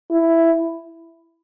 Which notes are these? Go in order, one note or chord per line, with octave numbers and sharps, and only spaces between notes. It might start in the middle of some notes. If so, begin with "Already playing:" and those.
E4